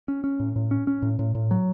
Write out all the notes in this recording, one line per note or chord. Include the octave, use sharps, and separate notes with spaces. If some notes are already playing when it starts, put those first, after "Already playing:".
C#4
C#4
A2
A2
C#4
C#4
A2
A2
A2
F#3